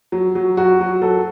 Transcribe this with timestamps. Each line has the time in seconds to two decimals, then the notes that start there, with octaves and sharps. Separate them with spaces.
0.12 F#3
0.35 F#3
0.57 F#3 F#4
0.80 F#3
1.02 F#3 A4